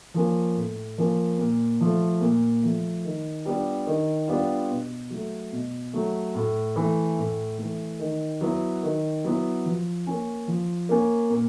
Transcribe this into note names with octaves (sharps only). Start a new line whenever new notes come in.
F3 A#3 C#4
A2
F3 A#3 C#4
A#2
F3 A3
A#2
F3 A3
D#3
G3 B3 D4 F4
D#3
G3 B3 D4 F4
B2
F#3 A3
B2
F#3 A3
A2
E3 A3
A2
E3 A3
D#3
F#3 B3 E4
D#3
F#3 B3 E4
F3
A#3 C#4
F3
A#3 C#4
A#2